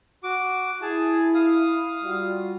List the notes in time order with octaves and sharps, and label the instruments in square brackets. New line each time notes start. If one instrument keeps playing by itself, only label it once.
[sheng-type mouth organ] F#4 D6
[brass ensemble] E4 [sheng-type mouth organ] G#4 A5
[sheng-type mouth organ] F5 D#6
[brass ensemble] G3 F4 F#4